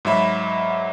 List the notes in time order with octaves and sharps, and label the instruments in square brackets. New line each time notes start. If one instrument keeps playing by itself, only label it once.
[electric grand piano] G#2 F#3 E5 B5